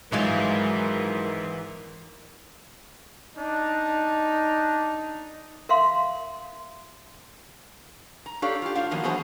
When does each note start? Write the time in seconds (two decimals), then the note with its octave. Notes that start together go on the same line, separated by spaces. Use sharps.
0.12 G#1 G#2 E3 F#3 G#3 F4 A#4
3.38 D4 D#4
5.69 A#4 E5 F5 C6
8.26 A#5
8.42 D4 G4 A4 C#5 D5 F5
8.62 F4 G4
8.75 A2 D4 F4 F5
8.91 D#3 F3 F#3 A#3 B3
9.03 E3 F#3 B3 G#4 C5 A5